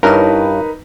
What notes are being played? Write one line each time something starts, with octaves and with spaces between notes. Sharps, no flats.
G2 D#4 E4 A#4 B4 C#5 B5